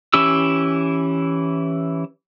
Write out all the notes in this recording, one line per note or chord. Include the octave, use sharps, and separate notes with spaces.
E3 C#4 E4 G4 E6